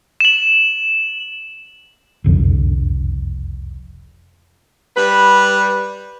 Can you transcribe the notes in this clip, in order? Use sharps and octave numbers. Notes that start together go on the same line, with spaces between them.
E7 F#7
F#1 C2 F2 D3
G3 B4